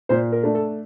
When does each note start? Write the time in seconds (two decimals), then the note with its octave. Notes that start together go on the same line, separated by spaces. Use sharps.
0.09 A#2 C5
0.32 A#4
0.43 A3 D4
0.55 A4